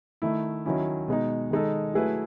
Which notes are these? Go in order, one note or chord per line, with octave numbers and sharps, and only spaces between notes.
D#3 A3 E4
D#3 F#3 C#4 E4
B2 G#3 D#4
D#3 G#3 D#4 A4
F#3 A3 E4 G#4 B4